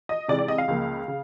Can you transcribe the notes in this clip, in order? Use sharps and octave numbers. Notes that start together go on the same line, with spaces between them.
D#5
C3 E3 G#3 D5
D5
D#5
F5
C#2 C#3 F3 A#3
C#3